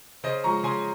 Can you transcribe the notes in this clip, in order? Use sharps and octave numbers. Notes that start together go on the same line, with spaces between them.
C#3 C5 D#5
F3 G#3 A#5 C#6
C#3 G#5 C6